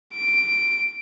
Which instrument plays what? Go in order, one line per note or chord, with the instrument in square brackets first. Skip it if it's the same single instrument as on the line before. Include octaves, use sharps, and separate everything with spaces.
[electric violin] D7